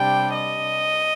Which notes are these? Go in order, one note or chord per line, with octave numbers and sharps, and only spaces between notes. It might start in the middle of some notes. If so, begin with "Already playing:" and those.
Already playing: C3 G3 D4 G5
D#5